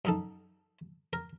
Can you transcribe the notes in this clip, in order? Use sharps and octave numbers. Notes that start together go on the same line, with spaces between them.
F#2 D#4 A4
A#4